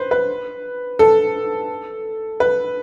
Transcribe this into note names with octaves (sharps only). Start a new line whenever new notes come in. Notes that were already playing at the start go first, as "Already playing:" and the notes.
Already playing: B4 C5
B4
A4
B4